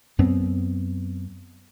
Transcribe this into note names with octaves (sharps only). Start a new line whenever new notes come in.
F#2 B3 C4